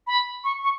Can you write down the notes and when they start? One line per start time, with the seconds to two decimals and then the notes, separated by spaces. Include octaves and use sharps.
0.07 B5
0.44 C#6
0.64 C#6